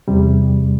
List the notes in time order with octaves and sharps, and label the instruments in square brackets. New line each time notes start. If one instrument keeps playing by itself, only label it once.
[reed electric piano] E2 C3 G3